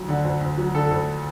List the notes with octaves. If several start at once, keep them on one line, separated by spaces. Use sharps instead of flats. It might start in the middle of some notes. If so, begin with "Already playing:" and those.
Already playing: D2 F#3
D3
D2
D2
F#3
D3 A4
A4
D2